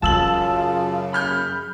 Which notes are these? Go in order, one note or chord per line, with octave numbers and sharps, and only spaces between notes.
F#2 C#3 E3 F#3 F4 A5 E6 F#7
B5 F6 G6